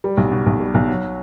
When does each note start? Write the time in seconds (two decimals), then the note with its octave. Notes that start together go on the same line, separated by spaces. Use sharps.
0.04 G3
0.17 B1
0.32 B2
0.46 B1
0.60 G3
0.74 B1
0.88 F#3